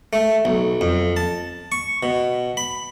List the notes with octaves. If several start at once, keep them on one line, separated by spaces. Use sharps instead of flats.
A3
B1
F2
A5
C#6
B2
B5